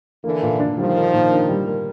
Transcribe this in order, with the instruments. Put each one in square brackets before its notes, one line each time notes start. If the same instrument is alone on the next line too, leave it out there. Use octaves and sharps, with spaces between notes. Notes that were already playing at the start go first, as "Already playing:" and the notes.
[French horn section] D3 E3 [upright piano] A#3
[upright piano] A#2
D4
[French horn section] D#3 F3 [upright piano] G3
[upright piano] A#3
A#2
D4
G3
A#3